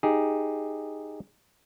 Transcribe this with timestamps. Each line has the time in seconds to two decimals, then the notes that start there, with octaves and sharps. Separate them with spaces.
0.03 D#4 G4 G#4